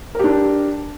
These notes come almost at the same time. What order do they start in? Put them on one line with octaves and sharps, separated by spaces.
A#4 G4 D4